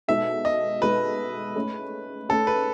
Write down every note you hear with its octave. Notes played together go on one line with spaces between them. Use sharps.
B2 G#3 D#4 A4 E5
D#5
B2 G#3 D#4 A4 B4
A3 C#4 G#4
A3 C#4 G#4 A4
B4